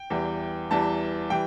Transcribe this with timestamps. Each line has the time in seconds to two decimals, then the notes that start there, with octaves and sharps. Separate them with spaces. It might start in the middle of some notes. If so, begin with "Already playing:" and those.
Already playing: G5
0.10 E2 E3 G3
0.71 E2 E3 G3 A5
1.30 E3 G3 G5